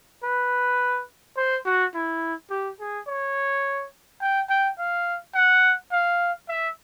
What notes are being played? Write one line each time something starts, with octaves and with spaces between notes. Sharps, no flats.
B4
C5
F#4
E4
G4
G#4
C#5
G5
G5
F5
F#5
F5
E5